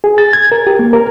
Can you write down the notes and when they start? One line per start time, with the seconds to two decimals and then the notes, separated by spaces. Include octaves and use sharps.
0.04 G#4
0.18 A6
0.33 G#6
0.52 A#4
0.67 G4
0.79 A#3
0.93 A#4